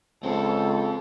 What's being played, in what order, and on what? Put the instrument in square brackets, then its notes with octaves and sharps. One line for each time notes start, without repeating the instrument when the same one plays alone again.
[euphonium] C#2 [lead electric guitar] F3 C4 [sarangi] A4